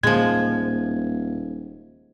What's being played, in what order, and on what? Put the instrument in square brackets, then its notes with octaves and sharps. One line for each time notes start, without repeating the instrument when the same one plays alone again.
[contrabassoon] D#1 [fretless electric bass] A#2 [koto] F3 G#3 [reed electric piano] G#6